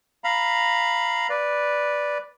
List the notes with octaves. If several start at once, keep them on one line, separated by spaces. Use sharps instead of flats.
F5 A#5 B5
B4 D5